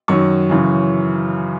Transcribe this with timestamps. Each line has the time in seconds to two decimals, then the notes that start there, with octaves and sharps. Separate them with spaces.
0.08 F#2 D#3 F#3 C#6
0.50 F#2 C#3 E3